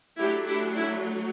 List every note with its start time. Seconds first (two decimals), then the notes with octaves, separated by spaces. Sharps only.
0.18 F#3 A3 D4 E4 G4
0.47 E4 G4
0.76 E4